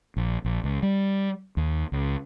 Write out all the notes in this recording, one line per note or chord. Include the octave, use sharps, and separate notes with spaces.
A#1
A#1
C#2
G3
D#2
C#2